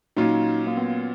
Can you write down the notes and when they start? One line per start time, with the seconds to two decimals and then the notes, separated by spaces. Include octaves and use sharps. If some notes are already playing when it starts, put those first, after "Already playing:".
0.17 A#2 F#3 C#4 D#4 F4
0.67 A#3
0.77 B3